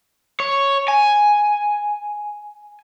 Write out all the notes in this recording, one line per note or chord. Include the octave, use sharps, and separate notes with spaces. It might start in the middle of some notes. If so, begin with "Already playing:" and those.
C#5
G#5